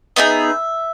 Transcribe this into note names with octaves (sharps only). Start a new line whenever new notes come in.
B3 D#4 G#4 E5